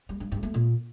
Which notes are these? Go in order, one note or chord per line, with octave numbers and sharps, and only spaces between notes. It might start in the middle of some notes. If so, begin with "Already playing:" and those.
G3
G2
G2
A3
A#2